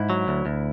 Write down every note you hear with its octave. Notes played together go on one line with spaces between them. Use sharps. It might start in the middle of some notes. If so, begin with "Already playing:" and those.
Already playing: G#2 E4
F#3
D2
D2